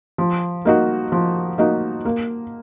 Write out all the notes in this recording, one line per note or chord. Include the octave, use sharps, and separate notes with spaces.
F3
A#3 D#4 F#4
F3
A#3 D#4 F#4
A#3